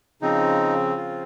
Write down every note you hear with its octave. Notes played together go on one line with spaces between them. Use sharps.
C#3 F3 C4 D#4
F4